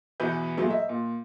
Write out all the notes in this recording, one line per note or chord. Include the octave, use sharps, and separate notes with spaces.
E2 B2 E3 B3 B4 G6
A#2 F#3 A3 B3 G#4
D#5 E5
A#2